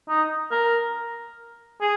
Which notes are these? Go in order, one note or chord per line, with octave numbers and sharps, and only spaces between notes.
D#4
A#4
G#4